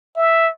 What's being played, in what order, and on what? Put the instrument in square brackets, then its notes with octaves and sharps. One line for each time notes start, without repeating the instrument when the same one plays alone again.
[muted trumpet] E5